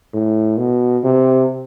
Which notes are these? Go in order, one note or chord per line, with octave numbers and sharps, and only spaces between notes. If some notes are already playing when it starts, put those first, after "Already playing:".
A2
B2
C3